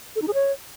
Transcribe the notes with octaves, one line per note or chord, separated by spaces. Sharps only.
A4
D#4
G#4
C#5